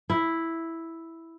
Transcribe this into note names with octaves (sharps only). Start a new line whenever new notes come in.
E4